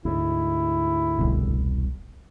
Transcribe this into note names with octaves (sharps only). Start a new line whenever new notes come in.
D2 G#2 E4
E1 C2 B2